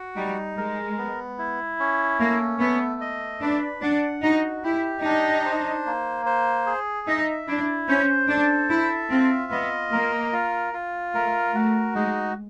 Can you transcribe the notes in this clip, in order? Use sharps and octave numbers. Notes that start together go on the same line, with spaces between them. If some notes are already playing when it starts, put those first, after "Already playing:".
Already playing: F#4
G3 D#4
G#3 A#4
B3
E4
C#4
A3 A#3
A3 B3
D#5
D4 B4
D4 F#5
D#4 F#4
E4 G4
D4 D#4
C5
A#3
C5
G#4
D#4 E5
D4 E4
C#4 C5
D4 A4
E4 E5
C4 F4
B3 D#5
A#3 A#4
F4
F4
A3 A#4
A3 F#4
G#3 D#4